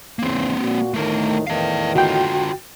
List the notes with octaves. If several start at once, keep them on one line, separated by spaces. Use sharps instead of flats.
E2 G#2 C#3 A#3 C4
A#2 F#4
D2 A2 D#3 A3 A#4
E2 A2 D#3 B4 F5
D3 F4 F#4 G5